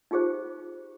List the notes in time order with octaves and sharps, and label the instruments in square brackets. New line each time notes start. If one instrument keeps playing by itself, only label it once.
[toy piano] D#4 F4 G4 G#4 C5